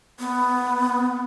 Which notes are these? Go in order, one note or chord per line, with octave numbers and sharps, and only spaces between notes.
B3